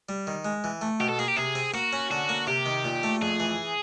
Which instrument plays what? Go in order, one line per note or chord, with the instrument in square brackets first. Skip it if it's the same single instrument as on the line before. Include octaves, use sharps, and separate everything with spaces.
[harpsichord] G3
D#3
G#3
E3
A3
[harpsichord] B2 [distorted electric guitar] G4
[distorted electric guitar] A4
[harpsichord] A#3 [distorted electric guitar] G#4
[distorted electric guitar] G4
[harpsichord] C3 [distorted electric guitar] G#4
[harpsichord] C4
[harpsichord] A#3 [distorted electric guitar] F#4
[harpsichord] C#4
[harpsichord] D3 [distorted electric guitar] F#4
[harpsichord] A#3
[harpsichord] C3 [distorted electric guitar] G4
[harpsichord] D#3
A#2
A3
[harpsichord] F2 [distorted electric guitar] G#4
[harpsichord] E3